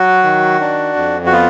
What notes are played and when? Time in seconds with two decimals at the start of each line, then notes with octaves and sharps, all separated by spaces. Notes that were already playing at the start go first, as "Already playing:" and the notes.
Already playing: F#3 F#4
0.23 D#3
0.61 D4
0.96 F2
1.26 F#4
1.32 B3 F4